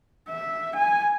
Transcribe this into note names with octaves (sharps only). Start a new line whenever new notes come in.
E5
G#5